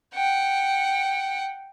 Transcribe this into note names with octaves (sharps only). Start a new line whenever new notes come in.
F#5 G5